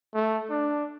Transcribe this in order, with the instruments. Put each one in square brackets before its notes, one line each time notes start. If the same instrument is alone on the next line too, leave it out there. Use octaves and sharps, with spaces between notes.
[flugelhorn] A3
D4